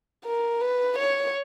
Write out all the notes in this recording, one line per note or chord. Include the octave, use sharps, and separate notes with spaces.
A#4
B4
C#5